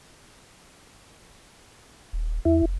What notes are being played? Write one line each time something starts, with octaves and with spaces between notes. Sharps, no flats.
D#1
E2 E4
F1